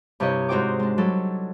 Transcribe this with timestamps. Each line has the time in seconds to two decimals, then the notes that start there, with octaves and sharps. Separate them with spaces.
0.20 G2 C3 E4 G4 C#5 D#5
0.49 G#2 D#4 F#4 C5 G5 D6
0.80 G#3 D4
0.98 F#3 G3 A4